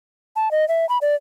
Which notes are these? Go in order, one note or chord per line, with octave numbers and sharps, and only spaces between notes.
A5
D#5
E5
B5
D5